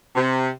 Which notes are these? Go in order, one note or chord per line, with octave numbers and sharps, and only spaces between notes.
C3